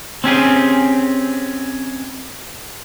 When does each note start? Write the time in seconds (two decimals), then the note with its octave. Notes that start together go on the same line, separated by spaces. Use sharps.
0.24 C4 C#4 G4 G#4